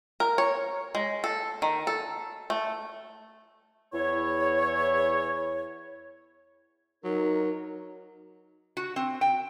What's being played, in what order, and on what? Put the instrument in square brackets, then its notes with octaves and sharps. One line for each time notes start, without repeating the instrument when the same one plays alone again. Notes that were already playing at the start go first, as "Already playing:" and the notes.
[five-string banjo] A#4
C#5
G#3
A4
D#3
A4
A3
[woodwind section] E2 E4 C#5
[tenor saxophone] F#3 [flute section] D#4 A#4
[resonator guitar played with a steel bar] F#4
C4
G5